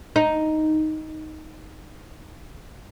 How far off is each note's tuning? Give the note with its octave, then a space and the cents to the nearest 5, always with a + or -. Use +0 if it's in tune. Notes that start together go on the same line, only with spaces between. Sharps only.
D#4 +0